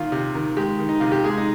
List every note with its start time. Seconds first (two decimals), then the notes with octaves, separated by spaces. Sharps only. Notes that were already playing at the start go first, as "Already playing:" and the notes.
Already playing: A#2 D#3 F4
0.12 C3
0.35 D#3
0.57 G#3 G4
0.79 D#3
0.89 D#4
1.00 C3 F4
1.12 G4
1.24 G#3 G#4
1.37 D#4